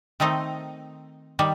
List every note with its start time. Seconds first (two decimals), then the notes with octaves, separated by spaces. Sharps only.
0.20 D#3 A3 C4 D#4
1.39 D#3 G3